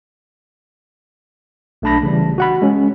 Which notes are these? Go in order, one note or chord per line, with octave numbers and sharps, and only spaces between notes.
B1 A3 D4 A5 B5 A#6
C#3 E3 G3
F#4 F#5 B5
G#3 C#4